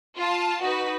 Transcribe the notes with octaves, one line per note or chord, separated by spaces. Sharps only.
F4 A5
D#4 F#4 B4